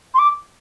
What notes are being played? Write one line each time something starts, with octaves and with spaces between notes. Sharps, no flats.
C6
D6